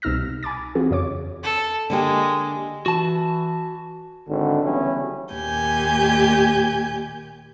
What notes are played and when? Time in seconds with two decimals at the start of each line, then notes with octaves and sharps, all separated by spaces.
0.02 C2 B2 D#4 E6 F6 A#6
0.43 G#5 B5 D6 A6
0.75 E3 C4 F4 F#4 G#4
0.91 F2 C#3 C#5 D6
1.43 A4
1.90 D3 G#3 A#3 G4
2.86 E3 F#4 A5
4.29 G#1 D3
4.63 C#3 E3 F#3 G3 B3 C#4
5.33 D#2 A#2 G4 G#5 G6